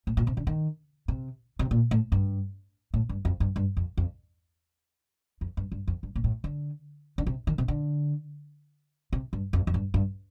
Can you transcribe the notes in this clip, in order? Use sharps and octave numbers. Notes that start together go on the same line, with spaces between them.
A2
A#2
C3
D3
D#3
C3
C3
A#2
A2
G2
A2
G2
F2
G2
G2
F2
F2
F2
G2
G2
F2
G2
A#2
A2
D3
D3
C3
D#3
C3
D3
C3
G2
F2
F2
G2
G2